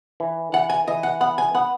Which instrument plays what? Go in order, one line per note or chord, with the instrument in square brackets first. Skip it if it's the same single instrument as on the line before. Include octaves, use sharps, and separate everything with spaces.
[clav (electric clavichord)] E3
[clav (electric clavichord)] E3 [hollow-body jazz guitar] F#5
[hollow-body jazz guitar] G#5
[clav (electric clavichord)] E3 [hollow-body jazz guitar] D#5
[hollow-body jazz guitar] F#5
[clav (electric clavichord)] B3 [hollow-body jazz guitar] F#5
[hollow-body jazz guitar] G#5
[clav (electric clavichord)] B3 [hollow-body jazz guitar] F#5